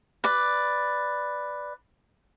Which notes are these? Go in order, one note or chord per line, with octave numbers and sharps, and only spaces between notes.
B4 D5